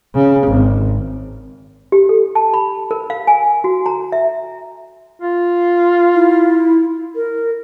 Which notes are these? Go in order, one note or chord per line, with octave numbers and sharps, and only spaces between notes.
C#3
G#1
G4
A4
A5
B5
A#4
F5
G#5
F#4
A#5
E5
F4
E4
A#4